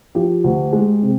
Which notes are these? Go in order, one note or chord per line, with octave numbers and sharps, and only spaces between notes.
F3 G4
D2
G#3
C3